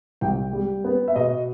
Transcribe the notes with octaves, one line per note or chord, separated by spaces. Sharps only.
C2 G5
G3
B3
E5
B2 D#5